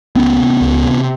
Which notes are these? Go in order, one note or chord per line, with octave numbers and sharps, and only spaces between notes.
C#2 B3 C#4
C3
C#2
C3